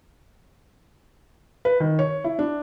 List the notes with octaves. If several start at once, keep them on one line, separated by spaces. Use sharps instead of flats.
B4
D#3
C#5
E4
D4